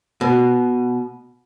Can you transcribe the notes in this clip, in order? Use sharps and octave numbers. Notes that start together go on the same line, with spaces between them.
B2